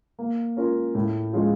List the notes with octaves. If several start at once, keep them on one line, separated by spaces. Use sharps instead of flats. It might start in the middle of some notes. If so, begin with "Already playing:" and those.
A#3
C#4 F4 A#4
A2
F3 G#3 C#4 F4